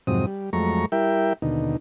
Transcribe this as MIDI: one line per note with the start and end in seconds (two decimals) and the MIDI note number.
0.07 0.26 41
0.07 0.26 44
0.07 0.26 48
0.07 0.26 54
0.07 0.26 60
0.07 0.26 87
0.27 0.50 55
0.53 0.86 41
0.53 0.86 54
0.53 0.86 56
0.53 0.86 57
0.53 0.86 82
0.53 0.86 85
0.92 1.33 55
0.92 1.33 64
0.92 1.33 70
0.92 1.33 76
0.92 1.33 79
1.42 1.77 39
1.42 1.77 47
1.42 1.77 50
1.42 1.77 63